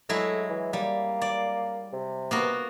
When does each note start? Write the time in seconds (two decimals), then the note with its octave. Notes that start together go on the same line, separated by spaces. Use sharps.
0.09 F#3 G#3 A3 E4
0.50 E3
0.73 G3 A#3
1.22 D5
1.93 C3
2.31 A#3 B3 F#4